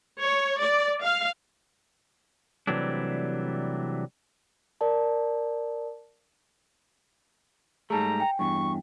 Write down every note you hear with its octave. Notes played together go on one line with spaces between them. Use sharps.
C#5
D5
F5
C3 E3 F#3 G3 A3 D4
A#4 D5 A5
G#2 G3 A3 G#4 A5 A#5
G5 G#5
E2 G2 C#6